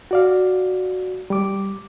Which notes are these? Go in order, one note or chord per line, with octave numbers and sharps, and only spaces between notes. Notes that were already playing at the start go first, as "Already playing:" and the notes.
F#4 D5 F5
G3 D6